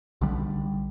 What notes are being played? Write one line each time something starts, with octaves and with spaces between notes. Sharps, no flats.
B1 D3 G3